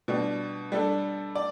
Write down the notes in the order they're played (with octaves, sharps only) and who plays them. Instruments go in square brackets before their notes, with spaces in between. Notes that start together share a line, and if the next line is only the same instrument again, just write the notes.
[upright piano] B2 G3 D4
G3 D4 A4
D5